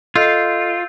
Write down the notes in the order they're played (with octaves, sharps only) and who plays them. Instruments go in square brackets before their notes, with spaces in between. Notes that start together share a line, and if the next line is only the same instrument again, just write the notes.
[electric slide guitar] F4 [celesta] A4 D#5 [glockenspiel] E6 G6 C7